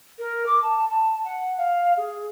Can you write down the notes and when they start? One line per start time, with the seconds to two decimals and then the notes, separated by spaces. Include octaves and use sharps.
0.19 A#4
0.46 D6
0.62 A5
0.89 A5
1.24 F#5
1.58 F5
1.97 G#4